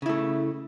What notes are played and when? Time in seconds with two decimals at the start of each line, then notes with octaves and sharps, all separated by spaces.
0.02 C#3
0.06 E4
0.09 A3